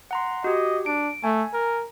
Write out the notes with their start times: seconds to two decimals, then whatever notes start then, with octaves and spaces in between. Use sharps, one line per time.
0.11 F#5 A#5 C6
0.44 F#4 G4 D#5
0.86 D4 D7
1.24 A3 G#5
1.54 A#4